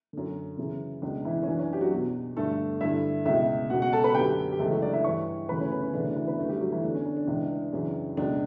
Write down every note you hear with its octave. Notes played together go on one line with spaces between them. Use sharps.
F#2 D3
F#2 C#3 E3
C#2 B2 D4
E3 E4
C#4
F#2 E3 D4
C#4
G4
F#3 F#4
E2 B2
G2 D3 A3 A4
G2 D3 E4 E5
C#2 B2 E4 E5
C#2 B2 F#4 F#5
F#4 F#5
A4 A5
B4 B5
F#2 D3 G4 G5
G4
C#2 C#3 E3 A3 A4
F#3 F#4
D4 D5
E4 E5
G2 E3 C#5 C#6
D2 C#3 E3 B4 B5
C#4 C#5
B3 B4
C#4
D2 C#3 E3 D4
D4
E3 E4
B3 B4
F#2 D3 A3 A4
G3 G4
F#3 F#4
E3 E4
E2 D3 D4
C#4
D4
D4
C#2 C#3 E3
F#2 C#3 E3
C#2 B2 D4